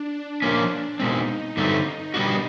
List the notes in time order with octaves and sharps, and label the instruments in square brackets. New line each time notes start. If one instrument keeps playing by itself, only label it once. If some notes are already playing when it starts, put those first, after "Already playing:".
Already playing: [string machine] D4
[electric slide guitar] A#2 F3 A#3 C#4
[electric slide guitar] B2 G#3 C4 [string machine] D#4
[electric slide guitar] G2 D3 F#3 A3 C4
B2 G3 B3 D4 F#4